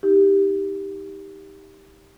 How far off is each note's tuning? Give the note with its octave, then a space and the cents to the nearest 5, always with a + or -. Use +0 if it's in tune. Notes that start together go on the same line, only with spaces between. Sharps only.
D#4 +25 G4 +5